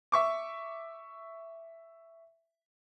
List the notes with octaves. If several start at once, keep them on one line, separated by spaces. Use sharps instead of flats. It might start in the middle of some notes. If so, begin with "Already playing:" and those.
E5 C#6 D6